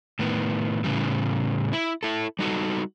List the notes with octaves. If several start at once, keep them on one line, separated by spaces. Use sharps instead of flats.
A2 D#3 B3
A2 C#3 E3 G3
E4
E4 A4
G3 D#4 F#4 A4